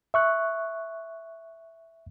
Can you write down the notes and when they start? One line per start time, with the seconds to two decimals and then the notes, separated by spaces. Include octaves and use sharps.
0.14 E5 C#6 F#6